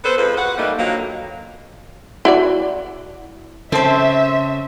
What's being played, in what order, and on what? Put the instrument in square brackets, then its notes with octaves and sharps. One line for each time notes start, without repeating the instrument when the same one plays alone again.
[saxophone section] B3 A4 B4 C5
F2 F3 G#3 B4
F#4 B4 F#5
E3 G3 A3 A#3 D#4
D3 D#3 F3 F#3 A#3
[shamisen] E4 F#4 D5
[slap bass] C#3 [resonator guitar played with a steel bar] C4 C5 [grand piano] A4 A5 [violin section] E5